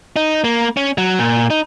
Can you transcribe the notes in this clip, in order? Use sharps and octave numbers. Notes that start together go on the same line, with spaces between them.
D#4
A#3
C#4
F#3
A#2
D#4